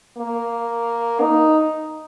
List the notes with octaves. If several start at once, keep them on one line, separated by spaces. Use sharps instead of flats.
A#3
D#4